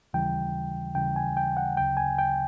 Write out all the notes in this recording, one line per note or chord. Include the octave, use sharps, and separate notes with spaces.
D#2 C#3 E3 G3 G5
D#2 C#3 E3 G3 G5
G#5
G5
F#5
D2 C#3 F#3 G5
G#5
G5